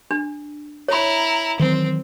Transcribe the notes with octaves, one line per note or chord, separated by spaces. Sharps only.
D4
E4 C#5 A#5 B5
D#3 E3 F#3 C4